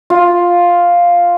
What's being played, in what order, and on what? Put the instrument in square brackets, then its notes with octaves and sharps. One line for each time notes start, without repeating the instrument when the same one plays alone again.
[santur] F4